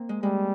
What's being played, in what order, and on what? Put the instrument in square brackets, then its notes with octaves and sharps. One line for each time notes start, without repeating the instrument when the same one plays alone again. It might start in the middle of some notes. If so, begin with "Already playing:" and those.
Already playing: [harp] A#3 C4
G#3
[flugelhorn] G3 [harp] G#3